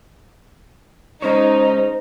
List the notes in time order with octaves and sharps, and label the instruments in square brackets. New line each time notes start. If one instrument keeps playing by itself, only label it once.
[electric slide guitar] G#3 C#4 C#5 [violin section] D#4 [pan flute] C5